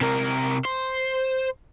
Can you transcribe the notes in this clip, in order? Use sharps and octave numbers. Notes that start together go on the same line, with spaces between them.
C3 A#4
C5